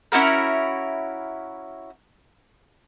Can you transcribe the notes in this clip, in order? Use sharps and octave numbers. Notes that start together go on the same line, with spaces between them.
C#4 E4 F#4 A#4